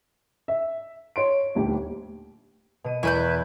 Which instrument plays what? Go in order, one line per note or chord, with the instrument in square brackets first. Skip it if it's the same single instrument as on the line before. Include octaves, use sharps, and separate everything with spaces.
[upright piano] E5
C#5 C6 D7
D#1 D2 G4
[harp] B2 D#7
[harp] E2 C#6 [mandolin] E4 B4 G6